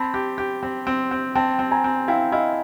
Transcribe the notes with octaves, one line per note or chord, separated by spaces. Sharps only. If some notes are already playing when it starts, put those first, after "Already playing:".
Already playing: C4 A5 B5
G4
G4
C4
C4
C4
C4 G5 A5
C4
G#5 A#5
C4
E4 F5 G5
E4 D#5 F5